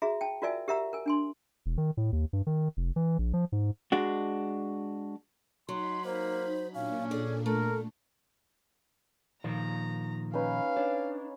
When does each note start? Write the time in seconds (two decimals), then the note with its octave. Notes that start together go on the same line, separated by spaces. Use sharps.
0.02 F#4 G#4 E5 A#5
0.21 G5 A5
0.42 F4 F#4 A#4 D5 E5 G#5
0.68 G4 A#4 E5 F#5 A#5 E6
0.93 A#4 G#5
1.06 D4 G#5 C6
1.66 E1
1.78 D#3
1.97 A2
2.12 D#2
2.33 G2
2.47 D#3
2.77 F1
2.96 E3
3.19 A#1
3.33 F3
3.52 G#2
3.92 G#3 D4 F#4
5.69 F#3 D#4 B5 C6
6.04 A#3 C5
6.74 A#2 A#3 C#4 D4 F5
7.11 G#4 A4 D5
7.46 A3 A4 A#4
9.44 A#2 D#3 F3 A#5 E6
10.34 C#4 D#4 B4 F5
10.77 D4 C#5